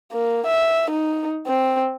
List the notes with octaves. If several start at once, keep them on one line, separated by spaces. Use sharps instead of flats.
A#3
E5
D#4
C4